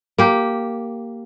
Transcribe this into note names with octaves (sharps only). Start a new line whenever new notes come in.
A#3 G4